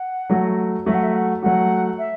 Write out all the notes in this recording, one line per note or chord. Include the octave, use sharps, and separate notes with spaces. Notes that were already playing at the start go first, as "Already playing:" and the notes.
Already playing: F#5
F#3 A3 F#4
F#3 A3 F#4 E5
F#5
E5
F#5
F#3 A3 F#4 F#5
E5